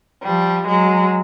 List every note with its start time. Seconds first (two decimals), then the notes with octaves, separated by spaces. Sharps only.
0.23 F3 G3
0.67 F#3 G#3